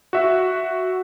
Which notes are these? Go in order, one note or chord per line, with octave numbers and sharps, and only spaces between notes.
F#4 E5